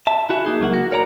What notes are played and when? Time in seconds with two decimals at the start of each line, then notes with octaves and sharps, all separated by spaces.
0.07 E5 A5
0.29 E4 F#4 E5 G#5
0.44 A#3 D#4 G#4
0.60 C#2 F#3 A#3 F#5
0.73 F#4
0.91 A#4 C#5 D5 A5 A#5